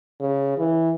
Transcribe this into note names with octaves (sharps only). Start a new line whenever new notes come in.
C#3
E3